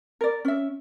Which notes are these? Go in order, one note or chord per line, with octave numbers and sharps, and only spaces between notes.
A#4 D5
C#4 E5